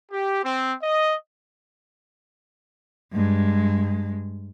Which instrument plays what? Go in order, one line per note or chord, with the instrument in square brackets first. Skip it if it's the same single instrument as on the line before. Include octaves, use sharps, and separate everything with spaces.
[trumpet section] G4
C4
D#5
[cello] G2 G#3